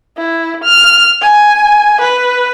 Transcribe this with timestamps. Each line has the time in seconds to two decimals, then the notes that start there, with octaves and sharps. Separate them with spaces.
0.18 E4
0.64 F6
1.21 G#5
2.01 B4